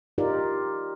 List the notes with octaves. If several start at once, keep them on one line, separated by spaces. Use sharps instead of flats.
D#4 F4 G4 A#4 D5